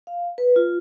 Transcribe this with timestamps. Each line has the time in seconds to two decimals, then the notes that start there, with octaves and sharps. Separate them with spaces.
0.07 F5
0.38 B4
0.56 F4